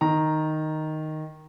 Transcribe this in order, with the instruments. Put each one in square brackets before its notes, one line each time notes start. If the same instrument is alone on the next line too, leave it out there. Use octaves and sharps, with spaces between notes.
[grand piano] D#3 A#5